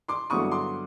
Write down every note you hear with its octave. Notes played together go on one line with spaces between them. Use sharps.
C6 D6
G2 D3 F#3 B3 E4 C#6 D#6
C6 D6